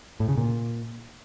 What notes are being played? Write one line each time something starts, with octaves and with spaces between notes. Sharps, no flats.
A2
C#3
A#2